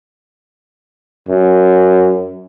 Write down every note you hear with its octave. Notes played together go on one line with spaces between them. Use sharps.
F#2